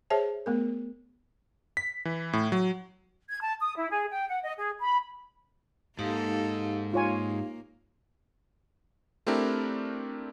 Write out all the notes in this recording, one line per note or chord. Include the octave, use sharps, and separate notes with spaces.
G#4 C5 C#5 E5 A5
A3 B3 A#4
B6
E3
A2
F#3
G#6
A5
D#6
E4
G#4
G5
F#5
D#5
G#4
B5
G#2 A#3 D#4 G4 A4 F5
A#3 F4 C#5 G#5
A3 C4 D4 E4 G4 A#4